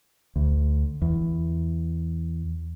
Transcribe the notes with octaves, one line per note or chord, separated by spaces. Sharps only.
D2
E2